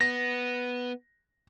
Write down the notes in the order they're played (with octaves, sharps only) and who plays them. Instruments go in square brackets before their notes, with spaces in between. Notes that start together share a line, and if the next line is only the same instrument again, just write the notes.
[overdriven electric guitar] B3 [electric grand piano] A#6